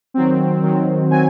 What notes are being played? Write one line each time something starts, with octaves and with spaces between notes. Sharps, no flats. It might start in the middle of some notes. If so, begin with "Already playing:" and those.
D#3 F#3 C4
D#3 F#3 C4
D#3 F#3 C4 G#5